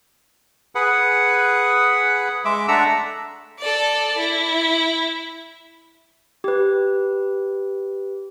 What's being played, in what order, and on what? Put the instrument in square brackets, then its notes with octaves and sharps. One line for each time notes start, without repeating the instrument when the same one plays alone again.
[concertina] G#4 B4 F#5
G#3 E5 D6
A3 D4 E5 F#5 A#5 E6
[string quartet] A4 D5
E4
[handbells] G4 B4